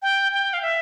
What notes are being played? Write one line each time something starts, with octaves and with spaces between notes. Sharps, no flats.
G5
G5
F5
E5